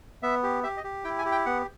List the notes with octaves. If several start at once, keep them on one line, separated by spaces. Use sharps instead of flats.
B3 E5
G4
G4 E5
D#5
G4
E4 G5
G#5
G4
G5
B3 F#5